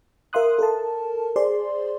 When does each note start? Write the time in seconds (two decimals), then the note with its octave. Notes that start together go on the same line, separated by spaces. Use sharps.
0.33 A#4 E5 F5 C6 D#6 F#6
0.59 A4 A#4 A5
1.36 G#4 C5 D5 C6